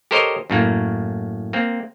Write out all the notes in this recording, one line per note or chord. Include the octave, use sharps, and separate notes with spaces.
G4 A4 A#4 C5 C#5 D#5
F#2 A2 A#3
A#3 C4